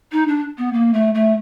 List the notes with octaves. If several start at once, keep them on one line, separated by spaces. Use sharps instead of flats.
D#4
D4
B3
A#3
A3
A3